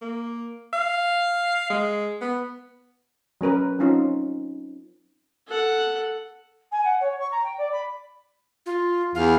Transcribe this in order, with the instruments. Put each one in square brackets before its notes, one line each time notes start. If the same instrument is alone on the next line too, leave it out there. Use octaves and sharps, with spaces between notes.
[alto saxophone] A#3
F5
G#3
B3
[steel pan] F#3 C#4 A#4 B4
F#3 C4 C#4 D#4 F4
[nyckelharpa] A4 F#5
[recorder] G#5
F#5
C#5
C#6
A#5
G5
D5
B5
F4
[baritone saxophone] E2 [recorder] F5